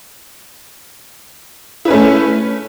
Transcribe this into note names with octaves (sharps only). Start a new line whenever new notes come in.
A3 C#4 E4 B4